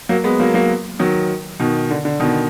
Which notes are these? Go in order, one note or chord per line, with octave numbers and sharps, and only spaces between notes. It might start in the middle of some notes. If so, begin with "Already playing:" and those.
F#3 A#3
G#3 B3
F#3 A#3
F#3 A#3
D#3 F#3
B2 D#3
D3
D3
B2 D#3